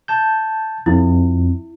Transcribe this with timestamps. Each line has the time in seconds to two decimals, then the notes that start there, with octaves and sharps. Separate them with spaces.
0.08 A5 G6
0.86 F2 E4